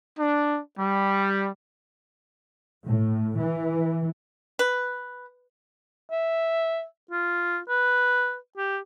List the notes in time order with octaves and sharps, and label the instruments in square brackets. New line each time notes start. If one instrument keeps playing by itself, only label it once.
[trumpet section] D4
G3
[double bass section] A2
E3
[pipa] B4
[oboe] E5
F4
B4
G4